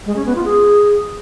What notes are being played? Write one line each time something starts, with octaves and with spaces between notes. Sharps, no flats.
G#3
C#4
B3
F4
G#4